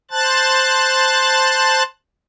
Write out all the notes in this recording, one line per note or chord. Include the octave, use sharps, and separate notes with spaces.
C5 A5 F#6 A6